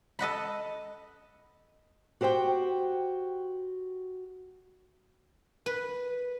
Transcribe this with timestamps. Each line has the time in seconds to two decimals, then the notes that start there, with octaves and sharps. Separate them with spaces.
0.19 A4 D#5 F#5 B5
2.21 F#4 G4 C5 E5 G5
5.66 B4